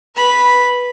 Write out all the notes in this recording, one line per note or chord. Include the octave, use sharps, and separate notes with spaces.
B4 B5